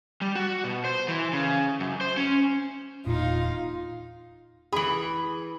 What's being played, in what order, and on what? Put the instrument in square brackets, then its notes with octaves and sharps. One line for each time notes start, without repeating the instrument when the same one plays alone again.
[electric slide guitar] G3
F#4
B2
C5
E3
C#3
F#2
C5
C#4
[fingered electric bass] E1 A#2 [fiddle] D#4 F5 [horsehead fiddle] F4
[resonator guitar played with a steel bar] E3 G#4 [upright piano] B5 F#7